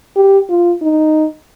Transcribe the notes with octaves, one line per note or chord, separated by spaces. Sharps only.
G4
F4
D#4